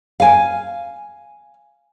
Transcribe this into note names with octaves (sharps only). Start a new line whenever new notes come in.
F5 G#5